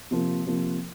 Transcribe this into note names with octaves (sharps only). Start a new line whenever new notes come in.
C3 F3 A#3
C3 F3 A#3